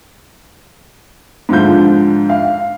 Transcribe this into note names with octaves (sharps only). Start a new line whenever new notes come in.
G#2 D3 F3 F4 G6
F5